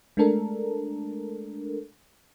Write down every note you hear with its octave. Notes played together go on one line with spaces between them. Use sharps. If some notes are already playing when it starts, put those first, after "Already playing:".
G#3 A3 D4 A4 A#4